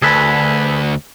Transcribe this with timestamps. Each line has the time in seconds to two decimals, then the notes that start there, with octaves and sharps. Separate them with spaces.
0.02 D2 G#4 A4 B4